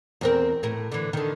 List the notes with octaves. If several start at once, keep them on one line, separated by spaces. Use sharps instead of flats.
E2 C4 A#4
A2 A#4
D3 E3
D3 D#3